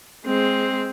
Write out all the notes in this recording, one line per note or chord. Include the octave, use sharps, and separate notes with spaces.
G#3 C4